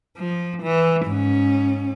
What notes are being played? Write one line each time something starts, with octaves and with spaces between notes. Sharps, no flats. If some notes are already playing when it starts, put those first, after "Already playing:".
F3
E3
G#2 C#4